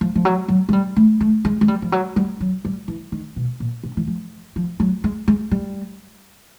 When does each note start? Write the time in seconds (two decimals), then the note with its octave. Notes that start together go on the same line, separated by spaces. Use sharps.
0.01 F3
0.15 F3
0.25 F#3
0.48 F#3
0.69 G#3
0.73 G3
0.96 A3
1.21 A3
1.45 G#3
1.61 G#3
1.68 G3
1.82 F3
1.92 F#3
2.16 G3
2.41 F#3
2.65 G3
2.88 E3
3.12 D#3
3.36 B2
3.60 A#2
3.84 C3
3.97 E3
4.07 F3
4.56 F3
4.80 F#3
5.04 G#3
5.28 G#3
5.51 G3